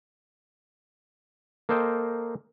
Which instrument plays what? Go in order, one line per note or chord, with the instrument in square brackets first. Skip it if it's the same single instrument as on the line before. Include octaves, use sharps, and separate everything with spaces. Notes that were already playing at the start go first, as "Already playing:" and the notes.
[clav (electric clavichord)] A#3 A4 C5 D#5 G5